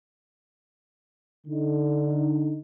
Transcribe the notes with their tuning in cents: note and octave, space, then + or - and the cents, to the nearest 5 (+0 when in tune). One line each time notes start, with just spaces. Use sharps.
D3 +0 D#4 +0